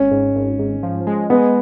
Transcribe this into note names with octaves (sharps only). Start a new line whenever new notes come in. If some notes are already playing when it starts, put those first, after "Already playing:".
Already playing: G#1 C#4
G#2
G#1
G#2
F3
G#3
G#3 B3